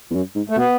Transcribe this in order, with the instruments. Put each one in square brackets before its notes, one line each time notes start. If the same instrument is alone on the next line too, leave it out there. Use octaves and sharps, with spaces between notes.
[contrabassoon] E2
F#2
G#2
[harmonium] A3
[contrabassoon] B2 [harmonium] B3